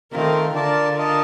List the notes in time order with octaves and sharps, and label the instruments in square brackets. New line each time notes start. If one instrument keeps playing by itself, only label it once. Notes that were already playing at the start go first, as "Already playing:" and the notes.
[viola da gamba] D#3 [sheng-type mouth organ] A3 C4 F4 A#4
[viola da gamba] D3 [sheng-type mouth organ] F4 A#4 D5 A5
[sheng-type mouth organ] F4 A#4 D#5 A5